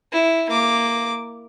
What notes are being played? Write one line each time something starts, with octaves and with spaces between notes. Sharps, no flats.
E4
A#3 D6